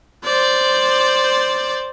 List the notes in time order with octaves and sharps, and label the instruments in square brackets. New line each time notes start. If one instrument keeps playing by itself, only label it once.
[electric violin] C5 D5